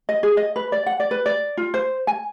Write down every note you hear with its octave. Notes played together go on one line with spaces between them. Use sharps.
D#5
G#4
D#5
B4
D5
F#5
D5
B4
D5
F4
C5
G#5